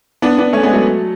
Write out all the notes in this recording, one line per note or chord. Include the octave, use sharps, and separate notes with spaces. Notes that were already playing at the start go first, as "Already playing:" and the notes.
B3 D4
B3 D4
A3 C#4
G#3 B3
F#3 A3